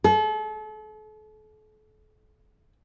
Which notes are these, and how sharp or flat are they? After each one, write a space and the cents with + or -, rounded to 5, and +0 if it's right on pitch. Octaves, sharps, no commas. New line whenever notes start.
A4 -40